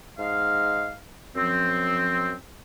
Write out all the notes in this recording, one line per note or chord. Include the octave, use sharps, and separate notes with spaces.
G#2 D#5 F5
F#2 F3 C4